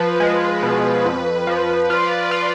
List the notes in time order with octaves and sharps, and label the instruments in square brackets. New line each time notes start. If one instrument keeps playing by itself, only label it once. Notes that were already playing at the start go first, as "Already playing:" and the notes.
Already playing: [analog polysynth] F3 [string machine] B4
[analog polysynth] G#3
B2
F2
F3
[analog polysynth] F4 [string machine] D5
[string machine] D5
[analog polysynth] F4